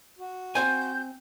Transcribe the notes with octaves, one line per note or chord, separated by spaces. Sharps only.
F#4
C4 C5 G#5 G6